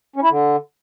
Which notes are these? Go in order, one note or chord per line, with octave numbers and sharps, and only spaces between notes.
C#4
E4
D3